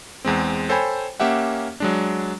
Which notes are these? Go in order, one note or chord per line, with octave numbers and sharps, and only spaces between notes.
E2 G#3 C4
A4 C5 C#5 G5 G#5 B5
A#3 C#4 G4 E5 F#5
F#3 G#3 D4